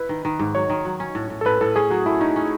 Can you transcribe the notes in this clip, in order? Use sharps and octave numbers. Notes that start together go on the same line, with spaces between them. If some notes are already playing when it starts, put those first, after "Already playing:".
Already playing: E4 B4
D#3
D#3
G#2
F#3 C#5
D#3
F#3
C#4
A2
A2
A4
A2 B4
A2 A4
C#4 G#4
F#3 F#4
A3 E4
C#4 D#4
C#4